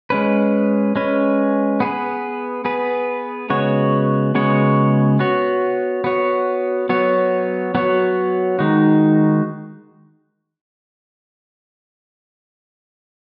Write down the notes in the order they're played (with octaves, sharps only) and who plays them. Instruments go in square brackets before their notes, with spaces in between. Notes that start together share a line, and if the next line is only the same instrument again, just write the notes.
[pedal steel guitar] G#3 C#4 B4
G#3 C#4 B4
B3 G#4 B4
B3 G#4 B4
C#3 G#3 B3 F#4 C#5
C#3 G#3 B3 F#4 C#5
B3 F#4 C#5
B3 F#4 C#5
F#3 B3 F#4 C#5
F#3 B3 F#4 C#5
D#3 G#3 D#4 F#4